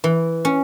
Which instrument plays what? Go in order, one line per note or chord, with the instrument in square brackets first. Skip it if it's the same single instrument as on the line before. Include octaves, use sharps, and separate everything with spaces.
[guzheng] E3
C#4